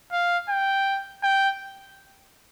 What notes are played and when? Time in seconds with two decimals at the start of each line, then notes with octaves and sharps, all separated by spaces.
0.12 F5
0.49 G5
1.23 G5